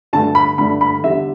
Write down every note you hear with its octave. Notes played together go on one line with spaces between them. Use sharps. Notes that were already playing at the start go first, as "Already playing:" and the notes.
G2 D3 A3 A5
B5
G2 D3 A3 B5
B5
E2 D3 G3 E5